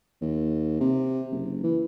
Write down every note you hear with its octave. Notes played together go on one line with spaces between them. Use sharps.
D#2
C3
F#1
E3